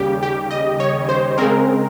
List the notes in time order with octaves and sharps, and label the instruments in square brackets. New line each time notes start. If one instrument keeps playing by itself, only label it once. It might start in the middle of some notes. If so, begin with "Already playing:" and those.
Already playing: [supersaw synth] D#2 C#3 G3 G4
G4
D#5
C#5
C5
C#3 G#3 C4 A#4